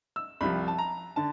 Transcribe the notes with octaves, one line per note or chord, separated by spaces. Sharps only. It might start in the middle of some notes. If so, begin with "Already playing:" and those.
E6
C2 C3 F3 B5
A5
A#5
D3 A5